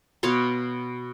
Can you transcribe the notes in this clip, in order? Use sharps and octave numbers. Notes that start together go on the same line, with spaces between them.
B2 C#5 F5 C6